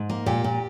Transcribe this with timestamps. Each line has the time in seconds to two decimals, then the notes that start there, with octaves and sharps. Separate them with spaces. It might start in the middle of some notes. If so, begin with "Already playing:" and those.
Already playing: G#2
0.10 A#3
0.26 A#2 G4
0.44 A#2